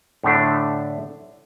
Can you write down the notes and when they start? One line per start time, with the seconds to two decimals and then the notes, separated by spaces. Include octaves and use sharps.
0.24 A2 D3 A3 D4